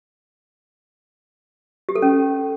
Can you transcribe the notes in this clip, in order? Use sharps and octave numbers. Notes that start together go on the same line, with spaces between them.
G4
A4
C#4